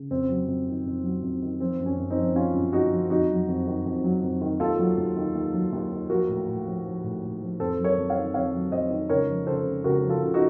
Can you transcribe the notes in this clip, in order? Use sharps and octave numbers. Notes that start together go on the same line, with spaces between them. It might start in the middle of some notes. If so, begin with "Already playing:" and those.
Already playing: C#3
F2 C4
F#3
F2
D#3
F2
F#3
F2
D#3
F3 C4
F#2
C#4
F#2
C4 D#4
F3
F3 C#4 F4
F#2
F#2 D#4 F#4
F3
F2 D#4 F#4
F#3
F2
D#3
F2
F#3
F2
D#3
D#2 F4 A4
F#3
D#2
D#3
D#2
F#3
D#2
D#3
F3 F#4 A#4
A2
A2
F3
F3
A2
A2
F3
F2 A4 C5
F#3
A#4 C#5
F2
C#5 F5
D#3
F2 C#5 F5
F#3
F2 C5 D#5
D#3
C#2 A#4 C#5
F3
C#2 A4 C5
C#3
C#2 F#4 A#4
F3
F4 A4
C#2
D#4 F#4